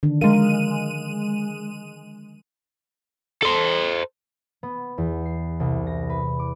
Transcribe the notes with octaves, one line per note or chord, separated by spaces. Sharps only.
D3 D#3 D4
F3 G#3 A#4 F5 D#7
A4 C5
B3
E2
C7
C2
A#6
B4
D6